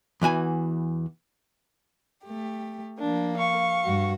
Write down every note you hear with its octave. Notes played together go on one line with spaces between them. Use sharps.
E2 E3 F#4 G#5
A3 G4
F3 A#3 D4
F5 C#6
G2 F#4